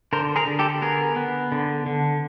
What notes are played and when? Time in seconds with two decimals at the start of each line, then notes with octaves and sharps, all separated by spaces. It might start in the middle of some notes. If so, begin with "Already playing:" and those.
0.13 D3 A#4 C5
0.36 G#4 A#4
0.47 D3
0.59 G4 A4
0.81 B3 G#4 A#4
1.16 B3
1.52 D3
1.86 D3